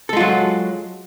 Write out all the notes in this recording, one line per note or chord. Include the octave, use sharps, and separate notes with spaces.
F#3 G#3 F4 A4